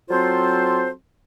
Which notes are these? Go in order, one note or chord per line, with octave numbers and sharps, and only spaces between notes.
F#3 C4 F4 A4 C5